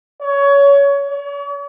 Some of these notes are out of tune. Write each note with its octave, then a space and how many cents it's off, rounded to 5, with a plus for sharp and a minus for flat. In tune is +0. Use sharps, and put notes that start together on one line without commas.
C#5 +20
C#5 +45